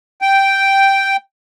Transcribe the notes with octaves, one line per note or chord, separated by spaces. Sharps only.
G5